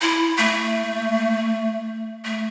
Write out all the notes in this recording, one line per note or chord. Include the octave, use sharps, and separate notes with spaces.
E4
A3
A3